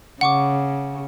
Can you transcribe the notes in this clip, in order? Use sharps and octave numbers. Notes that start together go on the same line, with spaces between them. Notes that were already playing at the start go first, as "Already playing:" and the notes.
C#3 F#5 C#6 D6